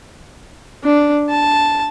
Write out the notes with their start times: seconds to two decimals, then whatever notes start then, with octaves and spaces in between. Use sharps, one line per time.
0.84 D4
1.30 A5